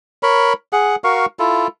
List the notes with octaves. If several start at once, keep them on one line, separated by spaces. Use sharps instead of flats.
A#4 C#5 B5
G#4 F#5
F#4 A#4 F5 C#6
E4 F4 A4